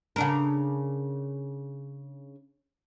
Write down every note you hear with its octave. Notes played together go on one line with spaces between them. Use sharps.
C#3 D4 A#4